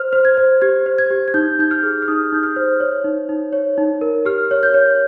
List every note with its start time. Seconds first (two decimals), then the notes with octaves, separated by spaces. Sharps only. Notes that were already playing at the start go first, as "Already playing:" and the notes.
Already playing: C5 F6
0.13 C5
0.25 G#6
0.38 C5
0.62 G4 G#6
0.86 C5
0.98 G#6
1.11 G4
1.28 G#6
1.34 D#4 G6
1.59 D#4 G6
1.71 F6
1.83 G#4
2.02 F6
2.08 D#4 D#6
2.32 D#4 G6
2.43 F6
2.56 C5
2.80 C#5
3.04 D#4
3.29 D#4
3.53 C#5
3.78 D#4
4.01 A#4
4.25 G4 F6
4.51 C#5
4.63 G6
4.74 C#5